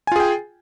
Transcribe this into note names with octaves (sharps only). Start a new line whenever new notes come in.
F4 G#4 G5 G#5